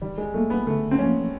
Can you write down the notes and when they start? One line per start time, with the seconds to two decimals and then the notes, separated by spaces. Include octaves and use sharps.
0.02 D#3 G3
0.18 G#3
0.34 G3 A3 A#3
0.50 B3
0.67 D3 A3
0.91 C4
0.99 F3 A#3 C#4